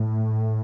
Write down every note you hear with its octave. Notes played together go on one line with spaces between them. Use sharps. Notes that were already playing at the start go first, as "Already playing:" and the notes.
Already playing: A2